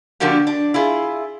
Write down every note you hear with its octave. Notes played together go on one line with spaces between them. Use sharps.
D3 F3 A#3 D4 F#4 G4
D4
E4 F4 G#4